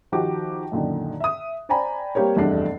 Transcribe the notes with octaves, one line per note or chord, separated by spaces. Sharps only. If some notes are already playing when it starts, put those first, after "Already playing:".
D#3 F3 F#4 G4 D6
F#2 A#2 D3 D#3
E5 D#6
C5 D5 G5 G#5 A#5 B5
G3 A#3 C4 G4 A#4 C#5
F1 E2 G2 A3 D4 C7